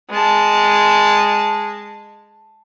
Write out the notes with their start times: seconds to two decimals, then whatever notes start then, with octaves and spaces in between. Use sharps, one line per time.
0.10 G#3 A5